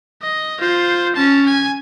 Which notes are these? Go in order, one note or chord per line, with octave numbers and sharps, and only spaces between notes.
D#5
F4 C5
C#4 A5
G#5